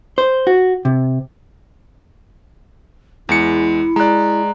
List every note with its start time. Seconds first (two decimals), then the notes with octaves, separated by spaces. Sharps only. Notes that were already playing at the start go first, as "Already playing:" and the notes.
0.18 C5
0.47 F#4
0.85 C3
3.29 E2 G#3 E4 C#7
3.96 G#3 D5 A#5 F#6